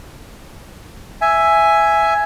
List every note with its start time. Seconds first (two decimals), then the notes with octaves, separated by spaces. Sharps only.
1.21 E5 G#5